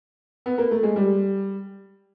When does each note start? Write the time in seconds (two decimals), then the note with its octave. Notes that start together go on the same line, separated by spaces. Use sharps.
0.46 B3
0.58 A#3
0.71 A3
0.83 G#3
0.96 G3